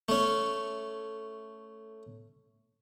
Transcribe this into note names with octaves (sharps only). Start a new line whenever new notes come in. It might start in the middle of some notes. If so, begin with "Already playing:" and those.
A3 C#4